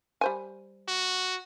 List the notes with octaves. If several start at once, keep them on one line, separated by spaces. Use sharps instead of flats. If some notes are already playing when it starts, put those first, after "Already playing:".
G3 C5 G#5
F#4